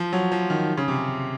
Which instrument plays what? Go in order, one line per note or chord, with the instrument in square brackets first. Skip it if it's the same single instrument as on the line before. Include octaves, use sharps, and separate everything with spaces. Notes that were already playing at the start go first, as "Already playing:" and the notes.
Already playing: [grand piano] F3
F#3
F3
D#3
C#3
C3